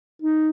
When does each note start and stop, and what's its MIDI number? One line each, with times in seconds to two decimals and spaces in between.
0.22 0.49 63